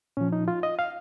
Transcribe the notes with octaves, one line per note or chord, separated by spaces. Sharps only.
A#2 F3 C#4
D#4
F4
D#5
F5